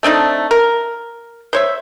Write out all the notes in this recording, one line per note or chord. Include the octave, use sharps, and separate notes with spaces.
A3 C4 D4 D#4
A#4
C5 C#5 E5